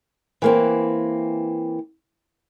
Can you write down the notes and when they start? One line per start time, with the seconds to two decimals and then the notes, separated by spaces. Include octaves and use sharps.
0.42 E3 A#3 C4